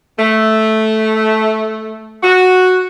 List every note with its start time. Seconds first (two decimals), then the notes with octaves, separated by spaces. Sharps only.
0.19 A3
2.23 F#4